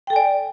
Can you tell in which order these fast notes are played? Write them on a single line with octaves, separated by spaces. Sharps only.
G5 A4 G#5 D5